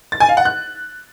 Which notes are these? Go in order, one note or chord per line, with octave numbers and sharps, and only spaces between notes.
A6
G#5
F5
F#5
F#6